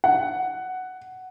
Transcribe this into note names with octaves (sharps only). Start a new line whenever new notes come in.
F#5